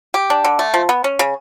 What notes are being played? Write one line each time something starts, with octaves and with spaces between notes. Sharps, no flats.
G4
D4
D3
A3
F3
B3
C#4
C#3